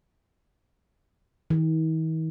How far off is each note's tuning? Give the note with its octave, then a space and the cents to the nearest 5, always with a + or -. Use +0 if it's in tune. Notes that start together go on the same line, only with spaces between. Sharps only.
D#3 +45